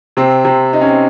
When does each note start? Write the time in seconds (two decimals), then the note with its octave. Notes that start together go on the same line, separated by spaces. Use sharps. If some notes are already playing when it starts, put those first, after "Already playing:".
0.17 C3 C4
0.45 C3 C4
0.73 D#4
0.81 C#4
0.89 C4